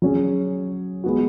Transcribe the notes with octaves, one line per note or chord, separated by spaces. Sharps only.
F#3 C#4 G#4
G#3 B3 F#4